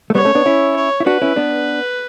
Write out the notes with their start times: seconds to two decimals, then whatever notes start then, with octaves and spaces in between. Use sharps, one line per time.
0.10 A3
0.15 G3 B3 C#5
0.25 A3 C#4
0.35 B3 D4
0.46 C#4 E4
0.76 C#5
1.00 E4
1.06 D4 F#4 B4
1.22 C#4 E4
1.36 B3 D4